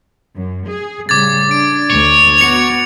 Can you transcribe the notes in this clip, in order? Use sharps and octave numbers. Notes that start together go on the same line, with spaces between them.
F#2
G#4
A2 C#3 G3 D6 G#6 A6
D4 D7
D2 C#5
B3 F#4 C#7 F7